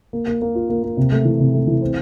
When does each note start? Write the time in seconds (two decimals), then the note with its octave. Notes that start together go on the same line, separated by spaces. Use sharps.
0.13 A#3
0.27 A#3
0.42 A#3
0.55 F4
0.70 A#3
0.83 A#3
0.97 C3
1.12 A3
1.25 E3
1.40 C3
1.54 A3
1.67 E3
1.82 C4